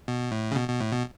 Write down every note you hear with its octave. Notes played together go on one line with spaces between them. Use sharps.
B2
A2
C#3
B2
B2
A2
B2